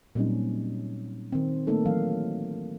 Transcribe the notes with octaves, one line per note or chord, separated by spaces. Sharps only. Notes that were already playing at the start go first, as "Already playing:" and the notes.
A#2 F#3 G3 C4 C#4 D#4
D#3 C4
A3 A#3 D#4 A4
E3 F#3 F5